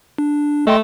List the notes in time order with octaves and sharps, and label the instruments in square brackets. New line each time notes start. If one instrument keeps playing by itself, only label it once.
[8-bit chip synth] D4
[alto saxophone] A3 [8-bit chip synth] D#5 G5 C6